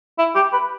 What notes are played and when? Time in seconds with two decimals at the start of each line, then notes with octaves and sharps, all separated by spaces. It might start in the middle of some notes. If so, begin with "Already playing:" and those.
0.18 E4
0.35 G4
0.52 B4